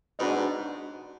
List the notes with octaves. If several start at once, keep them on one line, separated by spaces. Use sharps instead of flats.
G#2 D4 F#4 B4 D#5